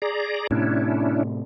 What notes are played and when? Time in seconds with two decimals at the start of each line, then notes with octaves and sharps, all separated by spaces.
0.02 G#4 D5 A#5
0.51 A2 C3 C#4 D4 E4